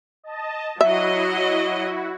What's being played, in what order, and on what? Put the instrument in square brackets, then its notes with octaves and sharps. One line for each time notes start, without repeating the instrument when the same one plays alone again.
[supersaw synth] D#5 A5
[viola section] F#3 D#5 [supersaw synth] E4 F#4 [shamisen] E5